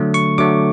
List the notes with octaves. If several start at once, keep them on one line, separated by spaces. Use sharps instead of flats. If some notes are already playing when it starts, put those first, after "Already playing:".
Already playing: D3 F#3 A3
C#6
D3 F#3 A3 D6